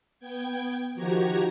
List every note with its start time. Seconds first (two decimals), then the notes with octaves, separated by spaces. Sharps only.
0.20 B3 G5 G#6
0.95 D#3 F3 F#4 G4 A#5 G#6